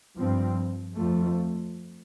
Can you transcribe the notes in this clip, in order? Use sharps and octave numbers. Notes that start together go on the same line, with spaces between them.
G2 F3 C4
F2 F3 A3